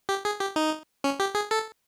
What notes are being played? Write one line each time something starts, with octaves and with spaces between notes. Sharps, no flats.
G4
G#4
G4
D#4
C#4
G4
G#4
A4